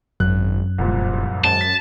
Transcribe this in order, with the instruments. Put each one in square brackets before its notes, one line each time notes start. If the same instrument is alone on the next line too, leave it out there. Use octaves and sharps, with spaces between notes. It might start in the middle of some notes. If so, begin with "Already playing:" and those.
[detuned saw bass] G#1 [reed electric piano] F#2 [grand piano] F#6
[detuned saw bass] E1 [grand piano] C2 F2 A#2
[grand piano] G#1 G#3 G7 [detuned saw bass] F#2 [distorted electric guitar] A5
[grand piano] B6